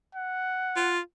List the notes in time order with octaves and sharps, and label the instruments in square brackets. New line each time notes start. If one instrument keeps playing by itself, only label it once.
[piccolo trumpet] F#5
[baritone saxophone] F4